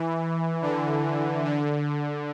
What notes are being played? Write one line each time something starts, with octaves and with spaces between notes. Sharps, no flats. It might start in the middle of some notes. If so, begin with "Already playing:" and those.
Already playing: E3
D3
D3